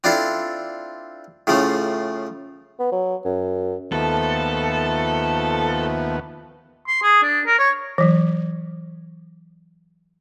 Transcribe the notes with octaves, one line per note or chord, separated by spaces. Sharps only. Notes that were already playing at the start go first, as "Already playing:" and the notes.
C4 D4 E4 F4 A4
A2 C#3 F3 A3
B3
F#3
F#2
D#2 F3 A3 B3 A4
C6
G#4
D4
A#4
C#5
E3 F#3